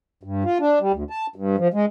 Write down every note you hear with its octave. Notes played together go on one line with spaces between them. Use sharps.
G2
F4
D4
G3
D2
A5
G2
F3
G#3